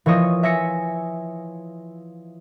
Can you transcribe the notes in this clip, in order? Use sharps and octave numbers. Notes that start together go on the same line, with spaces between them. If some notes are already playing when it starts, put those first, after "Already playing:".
E3 F3 C#5 D#5
E5 G#5 A#6 B6 C#7